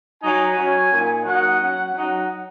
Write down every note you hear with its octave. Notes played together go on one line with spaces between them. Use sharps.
F#3 D#4 G#5
F#3 C#4
A#2 A#3 D#4
F#3 A#3 D#4 F#5
F#3 C#4
F#3 D#4 F#5